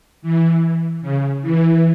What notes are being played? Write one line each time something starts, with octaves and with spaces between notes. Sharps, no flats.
E3
C#3
E3